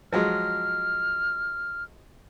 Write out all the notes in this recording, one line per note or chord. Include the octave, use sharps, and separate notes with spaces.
F3 F#3 G#3 F6